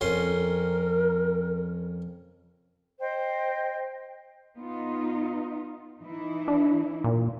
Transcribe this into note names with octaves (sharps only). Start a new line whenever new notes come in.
F2 C#4 A#4 C6
C5 D#5 G5
B3 D#4 F4
E3 D#4 E4
D4
A#2